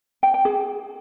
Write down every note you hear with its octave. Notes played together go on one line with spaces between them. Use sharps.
G5
G5
G#4